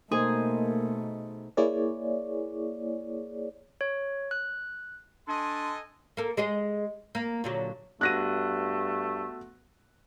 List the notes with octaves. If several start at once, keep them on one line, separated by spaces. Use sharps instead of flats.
B2 A3 A#3 D#4 G#4 C5
A#3 E4 G#4 C#5 D5
C#5
F#6
D4 A4 D#5 G#5 C6
A#3 A4
G#3 G#4 D#5
A#3
A#2 D3 F#3
G2 A3 B3 F#4 F#5 F#6 A#6 D#7